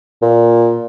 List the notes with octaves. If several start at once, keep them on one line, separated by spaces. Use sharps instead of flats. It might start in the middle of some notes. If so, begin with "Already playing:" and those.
A#2